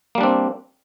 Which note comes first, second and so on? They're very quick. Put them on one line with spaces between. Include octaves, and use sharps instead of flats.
A#3 G3 D4 C4